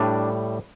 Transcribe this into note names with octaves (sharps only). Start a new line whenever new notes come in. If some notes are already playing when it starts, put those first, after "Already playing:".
Already playing: A2 G3 D4